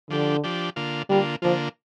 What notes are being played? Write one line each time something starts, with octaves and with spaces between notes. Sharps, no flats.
D3 F3 D4 G4
F3 D4 G4
D3 A#3 F4
D3 G3 A#3 F4
D3 F3 A#3 F4